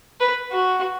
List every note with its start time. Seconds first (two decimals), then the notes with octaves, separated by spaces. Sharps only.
0.20 B4
0.52 F#4